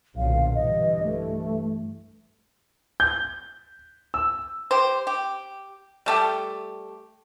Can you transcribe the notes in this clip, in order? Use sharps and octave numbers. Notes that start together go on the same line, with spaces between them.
B1 A#2 D3 F5
G2 E3 D#5
A3
G6
E6
G4 C5
G4
G3 A3 G4